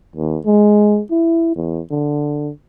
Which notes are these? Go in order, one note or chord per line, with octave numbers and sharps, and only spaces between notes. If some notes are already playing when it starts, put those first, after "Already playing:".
D#2
G#3
E4
E2
D3